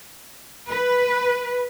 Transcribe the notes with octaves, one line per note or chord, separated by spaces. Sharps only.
B4